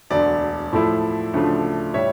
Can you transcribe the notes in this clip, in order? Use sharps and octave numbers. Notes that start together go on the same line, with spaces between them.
E1 D2 D3 D5
A2 F3 A3 E4
D2 C#3 F3 A3 D4
A2 G3 C#5 E5